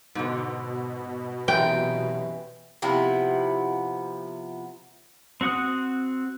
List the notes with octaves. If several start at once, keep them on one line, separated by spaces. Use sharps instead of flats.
G#2 B2 D3
F#2 C3 E3 G5
C3 F3 B3 E4
C4 F#4 F#5 D#6 F#6